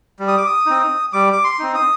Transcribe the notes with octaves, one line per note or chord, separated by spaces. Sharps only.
G3
D#6
D6
D#6
C4 D#4
G3 D6
D6
C6
C4 D#4
D#6